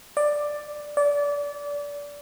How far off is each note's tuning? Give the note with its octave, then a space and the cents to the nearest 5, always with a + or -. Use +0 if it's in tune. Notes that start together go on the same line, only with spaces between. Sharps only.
D5 +10
D5 -25